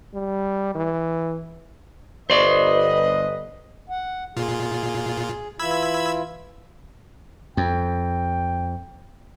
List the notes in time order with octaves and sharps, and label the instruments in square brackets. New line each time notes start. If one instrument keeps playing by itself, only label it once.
[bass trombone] G3
E3
[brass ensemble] G1 B4 D#5 [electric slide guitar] C5 D5
[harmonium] F#5
[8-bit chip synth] A#2 F4 [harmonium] G#4
[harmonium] E3 E4 F4 [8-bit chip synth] B5 E6 G#6
[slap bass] F2 [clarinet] G5